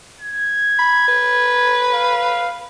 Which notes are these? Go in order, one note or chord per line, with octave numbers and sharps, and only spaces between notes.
G#6
B5
B4
F5